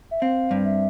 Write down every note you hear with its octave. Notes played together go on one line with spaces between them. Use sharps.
E5
C4 F5
G2
E5